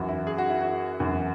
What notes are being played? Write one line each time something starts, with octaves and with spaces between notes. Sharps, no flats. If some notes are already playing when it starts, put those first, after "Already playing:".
Already playing: F#2 E3 F#4
E4
G#4
F#4
E4
F#4
F#2 E3